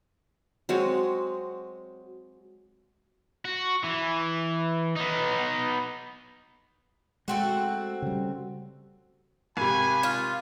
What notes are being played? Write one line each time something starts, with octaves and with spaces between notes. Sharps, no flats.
F#3 G#3 C4 F#4
F#4
E3
B3 D#4
G#3 A3 C4 F#4
C#3 G3
G#1 C3 G#5 B5
F4